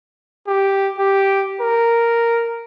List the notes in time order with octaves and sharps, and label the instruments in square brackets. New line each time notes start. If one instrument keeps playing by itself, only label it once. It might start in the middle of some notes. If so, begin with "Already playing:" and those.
[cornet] G4
G4
A#4